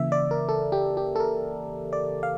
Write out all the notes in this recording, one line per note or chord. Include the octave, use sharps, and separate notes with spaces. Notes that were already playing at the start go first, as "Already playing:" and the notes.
Already playing: C#3 E3 A#3 E5
D5
A#4
A4
G4
G4
A4
A#4
D5
F5